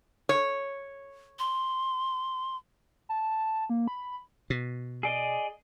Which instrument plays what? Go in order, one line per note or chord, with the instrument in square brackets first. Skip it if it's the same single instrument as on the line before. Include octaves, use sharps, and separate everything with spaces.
[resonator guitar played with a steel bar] C#5
[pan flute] C6
[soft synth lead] A5
A#3
B5
[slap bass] B2
[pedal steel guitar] G#4 D5 D#5